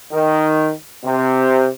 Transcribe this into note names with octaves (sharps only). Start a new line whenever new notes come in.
D#3
C3